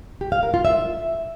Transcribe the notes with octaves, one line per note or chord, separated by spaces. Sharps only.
G4
F5
A#4
F4
E5